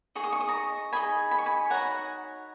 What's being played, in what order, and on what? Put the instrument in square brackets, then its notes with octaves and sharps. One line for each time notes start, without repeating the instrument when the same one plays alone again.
[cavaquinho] D#4 G#4 D#5 C#6
D#6
C#6
D#6
A#5 C#6
D#4 G#4 D#5 G#5 B5
B5
C#6
G#5 B5
D#4 F#4 C#5 F#5 A#5